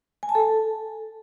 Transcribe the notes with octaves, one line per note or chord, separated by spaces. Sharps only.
G#5
A5
A4